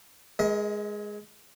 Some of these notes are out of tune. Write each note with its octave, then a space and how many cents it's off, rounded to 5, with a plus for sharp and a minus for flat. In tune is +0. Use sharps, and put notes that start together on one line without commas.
G#3 +0 A#4 +35 D#5 +40